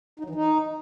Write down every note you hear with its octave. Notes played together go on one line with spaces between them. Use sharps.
D#4
F#3
E3
D#4